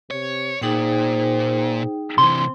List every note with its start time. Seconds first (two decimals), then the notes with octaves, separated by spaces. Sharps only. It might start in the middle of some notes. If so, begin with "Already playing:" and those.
0.11 C3 C#5
0.62 A#2 D#4 G#4 C5 G5
2.18 C3 E3 C4 C6